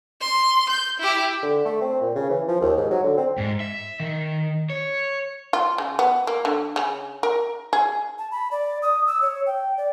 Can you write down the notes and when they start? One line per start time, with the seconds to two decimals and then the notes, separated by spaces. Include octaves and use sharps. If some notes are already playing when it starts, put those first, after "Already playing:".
0.21 C6
0.69 G6
0.99 E4 G4
1.43 D3
1.65 A3
1.81 C4
2.01 A#2
2.15 C#3
2.30 E3
2.48 F3
2.61 D#2
2.77 G#2
2.91 F#3
3.04 D3
3.17 C4
3.38 G#2
3.60 E5
4.00 D#3
4.70 C#5
5.53 F4
5.78 C#3
5.99 B3
6.27 A#3
6.45 D3
6.76 C#3
7.23 A#4
7.73 G#4
8.18 A5
8.31 B5
8.51 D5
8.82 D#6
9.07 E6
9.22 C#5
9.46 G5
9.77 D5